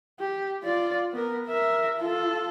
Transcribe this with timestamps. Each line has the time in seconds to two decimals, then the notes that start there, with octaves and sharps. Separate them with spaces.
0.20 G4
0.63 F4 D5
1.13 B3 A#4
1.48 A#4 E5
1.98 F4 A4